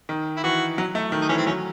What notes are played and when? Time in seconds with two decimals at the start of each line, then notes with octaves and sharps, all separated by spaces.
0.09 D#3
0.37 E4
0.44 E3 F#4
0.78 F#3
0.95 A3
1.12 D#3
1.21 D#4
1.29 E3 C#4
1.38 C4
1.46 F#3 C#4